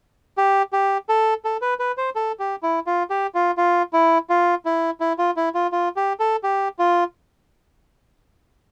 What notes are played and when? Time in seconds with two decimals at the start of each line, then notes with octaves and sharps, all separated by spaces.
0.37 G4
0.73 G4
1.09 A4
1.45 A4
1.62 B4
1.79 B4
1.97 C5
2.15 A4
2.39 G4
2.63 E4
2.87 F4
3.10 G4
3.35 F4
3.58 F4
3.93 E4
4.30 F4
4.65 E4
5.00 E4
5.18 F4
5.36 E4
5.55 F4
5.72 F4
5.96 G4
6.20 A4
6.43 G4
6.79 F4